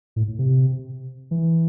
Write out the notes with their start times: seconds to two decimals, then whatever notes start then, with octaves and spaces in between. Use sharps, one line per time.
0.16 A2
0.39 C3
1.31 E3